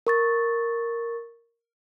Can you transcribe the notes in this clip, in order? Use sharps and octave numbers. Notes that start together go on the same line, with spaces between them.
A#4 C#6 A6